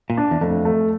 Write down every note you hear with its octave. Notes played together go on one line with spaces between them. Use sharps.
A#2
D4
E2
F2 A3
A3